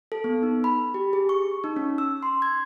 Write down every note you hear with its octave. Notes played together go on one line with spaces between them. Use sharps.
A4
B3
D#4
B5
G4
G#4
C#6
D#4
C#4
E6
C6
G#6